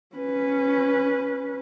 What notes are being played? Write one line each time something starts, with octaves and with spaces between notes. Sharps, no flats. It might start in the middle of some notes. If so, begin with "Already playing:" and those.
C#4 B4